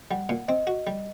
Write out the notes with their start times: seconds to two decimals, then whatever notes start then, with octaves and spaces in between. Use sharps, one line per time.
0.11 G3 F#5
0.29 A#2
0.48 C4 D#5
0.67 F#4
0.87 G3